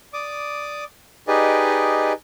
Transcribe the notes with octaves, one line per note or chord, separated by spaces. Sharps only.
D5 D6 D#6
D#4 G4 G#4 B4 D5 D#5